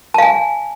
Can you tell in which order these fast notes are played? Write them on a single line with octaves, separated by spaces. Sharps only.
A5 F5 G#5